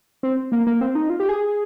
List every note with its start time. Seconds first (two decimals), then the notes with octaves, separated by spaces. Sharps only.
0.23 C4
0.52 A#3
0.67 A#3
0.81 C4
0.95 D#4
1.10 F4
1.20 G4
1.29 G#4